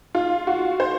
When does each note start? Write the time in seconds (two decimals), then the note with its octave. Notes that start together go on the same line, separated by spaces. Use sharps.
0.15 F4
0.47 F#4
0.80 C5